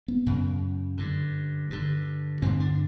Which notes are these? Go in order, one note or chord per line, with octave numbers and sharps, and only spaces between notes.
B3
F#2 C#3
G2 D3
G2 D3
G2 D3 C4
D4